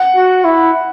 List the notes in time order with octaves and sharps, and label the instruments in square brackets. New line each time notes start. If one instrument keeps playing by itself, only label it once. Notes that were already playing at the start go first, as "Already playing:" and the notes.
Already playing: [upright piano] F#5
[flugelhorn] F#4
E4